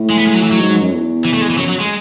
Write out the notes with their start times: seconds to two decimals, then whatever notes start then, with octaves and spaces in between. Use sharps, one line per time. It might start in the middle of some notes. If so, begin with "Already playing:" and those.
Already playing: A2
0.10 G#3
0.18 B3
0.27 G#3
0.34 F#3
0.42 E3
0.51 F#3
0.59 G#2
0.70 G#2
0.81 F#2
0.92 E2
1.25 E3
1.34 A3
1.41 G#3
1.50 E3
1.58 F#2 F#3
1.69 F#3
1.80 G#3